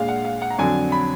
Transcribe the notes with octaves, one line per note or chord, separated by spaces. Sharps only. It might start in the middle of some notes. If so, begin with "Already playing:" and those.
Already playing: A#2 G#3 D4 F5
F#5
F5
F#5
A#5
F2 D3 F#3 D4 G#5
B5